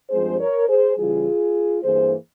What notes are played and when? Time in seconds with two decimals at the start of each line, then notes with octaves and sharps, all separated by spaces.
0.10 G2 F3 G#3 C4 G#4 C5
0.39 A#4 C#5
0.67 G#4 C5
0.96 C#3 E3 G3 F4 G#4
1.83 G2 E3 A#3 G#4 C5